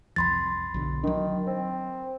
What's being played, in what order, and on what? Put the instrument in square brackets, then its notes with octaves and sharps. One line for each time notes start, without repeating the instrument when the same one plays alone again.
[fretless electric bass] C2 F2 F3 [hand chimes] B5 C6 A6
[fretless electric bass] B1 B2 D3
[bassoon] D#3 [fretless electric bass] F#3 D4
[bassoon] C4